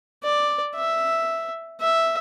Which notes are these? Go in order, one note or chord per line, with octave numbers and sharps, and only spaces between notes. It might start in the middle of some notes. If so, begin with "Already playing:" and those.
D5
E5
E5